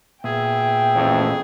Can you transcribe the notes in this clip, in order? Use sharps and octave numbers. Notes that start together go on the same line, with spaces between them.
A#2 B3 G#4 E5 G5
A1 F2 A3